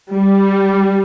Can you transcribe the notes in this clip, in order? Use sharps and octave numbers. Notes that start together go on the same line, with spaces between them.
G3